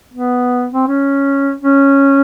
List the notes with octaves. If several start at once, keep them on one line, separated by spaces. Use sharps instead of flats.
B3
C4
C#4
C#4